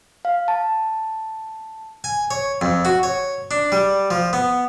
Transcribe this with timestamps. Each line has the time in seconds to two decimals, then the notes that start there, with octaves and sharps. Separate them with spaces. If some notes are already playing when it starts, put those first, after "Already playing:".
0.25 F5
0.48 A5
2.04 G#5
2.31 C#5
2.61 F2
2.85 F#4
3.03 C#5
3.51 D4
3.72 G3
4.10 F3
4.33 B3